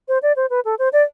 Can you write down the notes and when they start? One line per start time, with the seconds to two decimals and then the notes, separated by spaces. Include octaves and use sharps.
0.08 C5
0.23 D5
0.36 C5
0.50 B4
0.65 A4
0.79 C5
0.93 D5